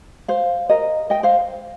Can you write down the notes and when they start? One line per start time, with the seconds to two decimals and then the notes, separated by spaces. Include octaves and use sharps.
0.28 C5 F5
0.69 A#4 D#5
1.10 D#5 G5
1.23 C5 F5